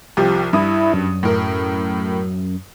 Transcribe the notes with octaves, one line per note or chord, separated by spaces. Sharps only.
C2 F3 G4
G2 E4 D#6
F#2
A2 A#4